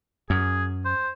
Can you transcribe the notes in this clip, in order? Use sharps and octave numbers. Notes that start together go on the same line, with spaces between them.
F#2 G#4
C5